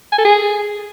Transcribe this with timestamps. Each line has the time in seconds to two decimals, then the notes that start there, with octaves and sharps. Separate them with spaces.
0.12 G#5
0.18 A4
0.25 G#4